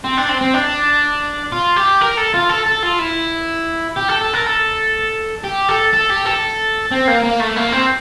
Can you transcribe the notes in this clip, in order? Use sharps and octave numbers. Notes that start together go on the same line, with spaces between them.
C4
D4
C4
C4
D4
F4
G4
A#4
A4
F4
A4
A4
F4
E4
G4
A4
A4
A#4
A4
G4
A4
A4
G4
A4
C4
A#3
A#3
A3
A#3
C4